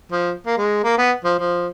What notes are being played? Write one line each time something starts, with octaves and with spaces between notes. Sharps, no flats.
F3
A#3
G#3
A#3
B3
F3
F3